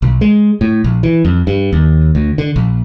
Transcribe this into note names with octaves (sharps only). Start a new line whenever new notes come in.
B1
G#3
A2
A#1
E3
F2
G2
D#2
D2
D3
A#1